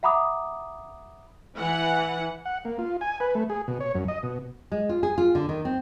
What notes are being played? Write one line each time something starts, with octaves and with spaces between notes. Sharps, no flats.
E5 F#5 A#5 B5 D6 D#6
E3 F#5
F#5
A#3
F4
G#5
B4
A3
G#4
B2
C#5
F#2
D#5
B2
G#3
F4
G#4
F4
D3
D#3
C4